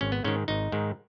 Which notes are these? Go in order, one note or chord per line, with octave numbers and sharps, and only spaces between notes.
G#1 C#4
B3
G#2 D#3 C#4
G#1 D#4
G#2 D#3